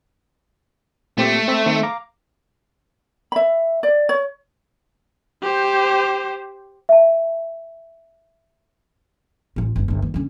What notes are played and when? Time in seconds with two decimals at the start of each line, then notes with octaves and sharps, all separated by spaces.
1.17 A#2 A3 C4 G4
1.48 C4 E5
1.66 D#3 C4
1.83 F5 A#5 D6
3.32 E5 B5
3.83 D5
4.09 C#5
5.43 G4 C5
6.89 E5 A5
9.56 A1 F4
9.76 G1 C#2
9.88 G1 D3
10.02 D#3
10.14 D3 C#4